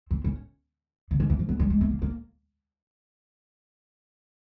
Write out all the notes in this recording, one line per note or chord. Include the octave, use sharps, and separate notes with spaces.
C4
C#4
D3
D#3
E3
F3
F#3
G3
G#3
A3
A#3
A#3